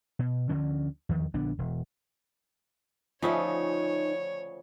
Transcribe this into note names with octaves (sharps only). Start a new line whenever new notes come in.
B2
D2 D3 F3 C#4
E2 D#3 F3
A#1 D3 B3 D4
E1
D2 C#3 F3 D#4 C#5 E5 G#5